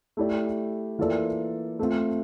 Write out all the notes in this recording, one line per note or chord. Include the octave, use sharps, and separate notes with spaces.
A3 E4 G4 D5
E3 A#3 F4 A4 D5
A3 C4 F4